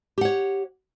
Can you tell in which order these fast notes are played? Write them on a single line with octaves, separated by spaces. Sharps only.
G4 F#5 C#5